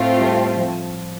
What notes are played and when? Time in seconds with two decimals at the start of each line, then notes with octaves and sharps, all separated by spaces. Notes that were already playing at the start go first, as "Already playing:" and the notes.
Already playing: A2 A3 C4 F4
0.20 G3
0.56 F3